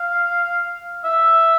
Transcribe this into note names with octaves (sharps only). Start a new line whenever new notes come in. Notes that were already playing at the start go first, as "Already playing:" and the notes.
Already playing: F5
E5